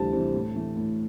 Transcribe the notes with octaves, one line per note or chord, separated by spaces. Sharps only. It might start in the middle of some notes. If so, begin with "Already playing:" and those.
Already playing: D2 C3 E3 G3 C4 A5
C3 E3 G3 C4
A2
E3 A3
A2